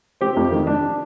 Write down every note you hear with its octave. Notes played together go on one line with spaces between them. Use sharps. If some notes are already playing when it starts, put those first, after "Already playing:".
C4 G4
F2
D#3
D4